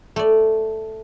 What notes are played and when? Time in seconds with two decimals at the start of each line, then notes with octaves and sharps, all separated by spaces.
0.16 A3 D5